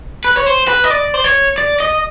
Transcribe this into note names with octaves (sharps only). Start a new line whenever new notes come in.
B4
C#5
C5
B4
D#5
D5
C5
C#5
D5
D#5